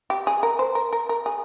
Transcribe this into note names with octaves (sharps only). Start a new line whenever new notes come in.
G4
G#4
A#4
C5
A#4
A#4
A#4
G#4